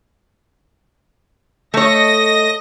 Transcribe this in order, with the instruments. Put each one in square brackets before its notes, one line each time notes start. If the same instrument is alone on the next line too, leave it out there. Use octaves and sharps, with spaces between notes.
[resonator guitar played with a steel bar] A3 C#5 [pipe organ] D#5 A#6